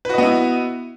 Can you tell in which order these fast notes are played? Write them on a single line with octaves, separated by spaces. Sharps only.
B4 F#4 D#5 B3 E4